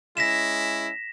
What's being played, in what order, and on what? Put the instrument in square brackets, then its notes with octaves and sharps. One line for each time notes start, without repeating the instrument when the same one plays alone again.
[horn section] G#3 C#4 E4 [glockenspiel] A#6 B6 E7